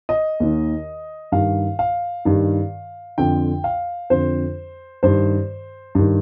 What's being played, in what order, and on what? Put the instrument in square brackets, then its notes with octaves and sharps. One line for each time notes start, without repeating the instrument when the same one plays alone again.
[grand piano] D#5
D#2 D#3
G2 D#3 F5
F5
G2 D#3
F2 D3 G5
F5
F2 D3 C5
G2 D#3 C5
G2 D#3